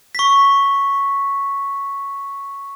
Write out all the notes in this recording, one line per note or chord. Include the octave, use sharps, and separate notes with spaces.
C#6 B6